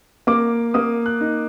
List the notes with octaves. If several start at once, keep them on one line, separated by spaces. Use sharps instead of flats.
A#3 D6
A#3 D#6
F#6
D#4